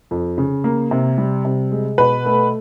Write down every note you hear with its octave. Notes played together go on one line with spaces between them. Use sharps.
F2
C#3
A#3
C3
G3
C3
G#3
B2 B4
A3